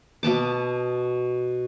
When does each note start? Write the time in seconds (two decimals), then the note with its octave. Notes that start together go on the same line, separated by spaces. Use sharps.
0.23 B2 B3 A5 D6